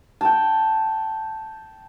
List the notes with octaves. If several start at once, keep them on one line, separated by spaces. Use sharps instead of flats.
G5 A5